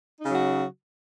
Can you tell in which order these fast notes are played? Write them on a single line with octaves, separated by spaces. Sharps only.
D#4 C#3 F#3 F#4